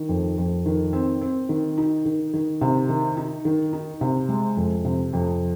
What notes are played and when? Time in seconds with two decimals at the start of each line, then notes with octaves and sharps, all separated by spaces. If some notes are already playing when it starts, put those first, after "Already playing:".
Already playing: D#3
0.09 F2
0.38 F2
0.66 D#3
0.93 C4
1.21 C4
1.49 D#3
1.78 D#4
2.05 D#3
2.33 D#3
2.61 C3
2.89 D#3
3.17 D#4
3.45 D#3
3.73 D#4
4.01 C3
4.29 G#3
4.57 F2
4.85 C3
5.13 F2